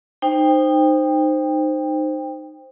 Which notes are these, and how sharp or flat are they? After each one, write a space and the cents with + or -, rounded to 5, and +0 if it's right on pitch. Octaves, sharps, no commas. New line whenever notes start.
D#4 -20 C5 +0 G5 +20